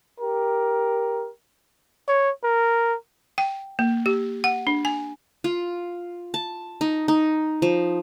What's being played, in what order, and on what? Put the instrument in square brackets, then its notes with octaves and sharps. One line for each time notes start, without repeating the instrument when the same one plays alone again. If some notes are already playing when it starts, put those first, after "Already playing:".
[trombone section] G4 A#4
[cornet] C#5
A#4
[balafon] G5
A#3
G4
F#5
D4
G#5
[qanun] F4
A5
D#4
D#4
F3